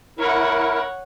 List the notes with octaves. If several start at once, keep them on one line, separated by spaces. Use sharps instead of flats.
E4 A#4 C#5 F#5